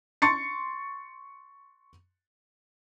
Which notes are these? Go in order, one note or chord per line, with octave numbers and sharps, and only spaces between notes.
C6 C#6 A6 C#7